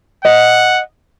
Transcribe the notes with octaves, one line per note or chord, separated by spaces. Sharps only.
D#5 F#5